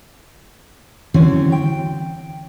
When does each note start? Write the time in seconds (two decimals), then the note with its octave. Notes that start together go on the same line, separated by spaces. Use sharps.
1.14 D3 E3 F#3 C4 C#4
1.52 G5